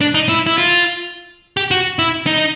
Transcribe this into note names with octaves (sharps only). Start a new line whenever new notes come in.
D4
D#4
E4
E4
F4
G4
F#4
E4
D#4